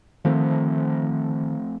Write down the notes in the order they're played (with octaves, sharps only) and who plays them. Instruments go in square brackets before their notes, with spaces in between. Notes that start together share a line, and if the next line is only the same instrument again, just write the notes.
[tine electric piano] D#3 [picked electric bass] F3 A3 C4